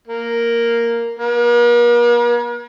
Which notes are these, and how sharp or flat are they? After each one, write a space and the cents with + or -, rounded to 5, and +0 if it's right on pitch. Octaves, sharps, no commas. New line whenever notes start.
A#3 +0
A#3 +45